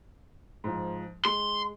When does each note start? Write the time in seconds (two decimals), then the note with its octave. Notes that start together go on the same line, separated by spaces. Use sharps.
0.64 G#2 F3
1.25 G#3 C6